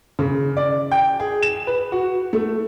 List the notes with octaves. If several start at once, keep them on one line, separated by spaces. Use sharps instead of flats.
C#3
D5
G5
G#4
E7
B4
F#4
A3